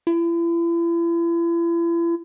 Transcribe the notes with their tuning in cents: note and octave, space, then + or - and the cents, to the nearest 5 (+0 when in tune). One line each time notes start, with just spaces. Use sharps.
E4 +40